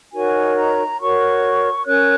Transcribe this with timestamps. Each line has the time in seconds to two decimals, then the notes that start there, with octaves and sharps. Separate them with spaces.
0.13 D#4 F#4 A#4 C#5 G#5
0.56 A#5
0.99 F#4 A#4 C#5 C#6
1.86 C#4 A#4 C#5 F#6